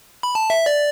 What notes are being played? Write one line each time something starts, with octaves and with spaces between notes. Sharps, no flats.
B5
A5
E5
D5